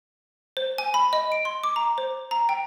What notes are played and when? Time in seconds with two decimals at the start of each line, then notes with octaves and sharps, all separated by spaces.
0.57 C5
0.78 G#5
0.94 B5
1.13 D#5
1.32 D7
1.45 C6
1.64 D6
1.76 A#5
1.98 C5
2.31 A#5
2.49 G5